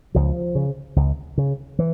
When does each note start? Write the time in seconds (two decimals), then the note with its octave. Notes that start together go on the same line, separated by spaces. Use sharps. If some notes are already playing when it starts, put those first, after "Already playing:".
0.15 C#2 F3
0.55 C#3
0.96 C#2
1.37 C#3
1.79 E3